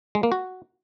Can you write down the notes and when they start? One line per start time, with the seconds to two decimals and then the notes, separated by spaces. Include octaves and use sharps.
0.15 G#3
0.23 A#3
0.32 F#4